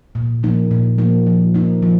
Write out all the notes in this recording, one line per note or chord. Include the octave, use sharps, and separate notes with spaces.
A#2
F3 A#3 D#4
A#2
F3 A#3 D#4
F3
A#3 D#4
F3